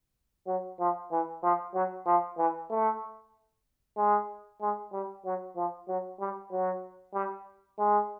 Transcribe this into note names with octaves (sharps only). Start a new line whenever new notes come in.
F#3
F3
E3
F3
F#3
F3
E3
A3
G#3
G#3
G3
F#3
F3
F#3
G3
F#3
G3
G#3